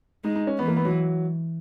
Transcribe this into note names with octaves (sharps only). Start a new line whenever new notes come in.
G#3 D#4
D#4
C#4
E3 B3
A#3
B3
F#3